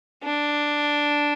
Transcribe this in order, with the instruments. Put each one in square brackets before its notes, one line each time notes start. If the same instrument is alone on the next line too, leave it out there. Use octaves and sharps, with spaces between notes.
[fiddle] D4